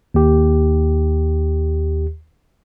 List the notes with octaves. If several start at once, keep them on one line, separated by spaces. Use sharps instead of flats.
D#2 G4